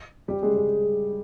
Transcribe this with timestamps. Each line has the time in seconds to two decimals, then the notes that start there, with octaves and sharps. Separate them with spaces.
0.28 G3 G4
0.42 G#3 G#4
0.56 G#4